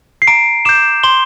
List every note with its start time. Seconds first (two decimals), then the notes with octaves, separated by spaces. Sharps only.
0.22 C7
0.27 A#5 D7
0.65 D6 G6 E7
1.03 C6 G7